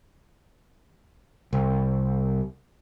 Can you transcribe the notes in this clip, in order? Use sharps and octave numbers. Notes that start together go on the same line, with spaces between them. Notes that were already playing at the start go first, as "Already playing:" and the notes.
C2